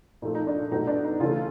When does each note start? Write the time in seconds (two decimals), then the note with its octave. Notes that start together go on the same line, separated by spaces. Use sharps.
0.22 A#2 F3 A3 D#4
0.35 D#4
0.47 D4
0.72 B2 F#3 A3 D#4
0.87 D4
1.04 D#4
1.20 C#3 E3 A3 F4